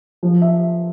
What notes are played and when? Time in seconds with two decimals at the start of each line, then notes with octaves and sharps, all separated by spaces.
0.23 F3
0.42 E5